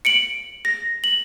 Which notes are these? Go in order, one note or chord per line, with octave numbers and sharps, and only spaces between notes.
C#7 D7 F#7
A#6
F#7